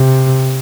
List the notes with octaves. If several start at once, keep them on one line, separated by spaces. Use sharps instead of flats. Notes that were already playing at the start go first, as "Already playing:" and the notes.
Already playing: C3